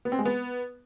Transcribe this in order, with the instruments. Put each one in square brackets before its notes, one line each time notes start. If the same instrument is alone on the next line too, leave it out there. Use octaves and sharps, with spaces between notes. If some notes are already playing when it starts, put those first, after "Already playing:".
[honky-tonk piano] B3
C4
G#3
B3